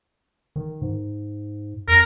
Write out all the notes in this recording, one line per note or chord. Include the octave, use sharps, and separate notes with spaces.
D#3
G#2
F2 A#4